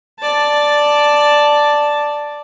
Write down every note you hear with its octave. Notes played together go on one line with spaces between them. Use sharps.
D5 A5